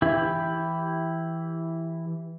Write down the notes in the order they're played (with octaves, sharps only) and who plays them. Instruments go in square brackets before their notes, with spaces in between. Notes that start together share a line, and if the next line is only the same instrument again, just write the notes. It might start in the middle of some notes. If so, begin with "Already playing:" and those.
[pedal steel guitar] E3 E4 G4